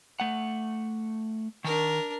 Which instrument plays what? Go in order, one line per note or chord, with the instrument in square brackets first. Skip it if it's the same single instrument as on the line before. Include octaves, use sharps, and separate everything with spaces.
[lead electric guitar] A3 F#5
[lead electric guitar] D#3 [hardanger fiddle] D4 A#4